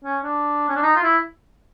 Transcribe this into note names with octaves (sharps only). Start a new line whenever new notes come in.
C#4
D4
C#4
D4
D#4
F4
E4